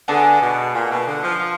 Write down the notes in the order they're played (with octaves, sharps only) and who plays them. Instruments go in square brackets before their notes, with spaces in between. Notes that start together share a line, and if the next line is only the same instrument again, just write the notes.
[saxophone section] D3 [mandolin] B3 D4 G#4
[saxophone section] B2
A#2
B2
D3
F3
F3